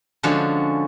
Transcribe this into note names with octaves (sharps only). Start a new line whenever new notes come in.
D3 F3 G#3 C#4 F#4